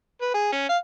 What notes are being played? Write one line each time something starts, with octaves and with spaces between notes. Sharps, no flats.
B4
G#4
C#4
F5